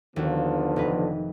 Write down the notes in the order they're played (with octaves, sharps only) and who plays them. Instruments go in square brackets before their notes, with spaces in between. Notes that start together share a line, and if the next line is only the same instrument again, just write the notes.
[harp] D#2 F#4 [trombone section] D3 F3 B3
[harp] F1 D#4 B4